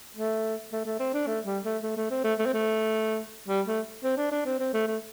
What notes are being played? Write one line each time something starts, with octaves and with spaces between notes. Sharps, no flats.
A3
A3
A3
C4
D4
A3
G3
A3
A3
A3
C4
A3
A3
C4
A3
G3
A3
C4
D4
D4
C4
C4
A3
A3